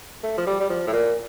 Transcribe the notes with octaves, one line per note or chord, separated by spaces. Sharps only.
A3
F3
G3
G3
F3
A2
A#2